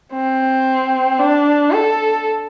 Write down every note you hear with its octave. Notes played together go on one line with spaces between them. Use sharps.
C4
D4
A4